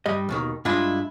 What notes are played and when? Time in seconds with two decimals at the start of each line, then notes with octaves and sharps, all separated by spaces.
0.06 G2 G3 D#5
0.29 D#2 B2 D#3
0.65 G2 G#3 D4 E4 F4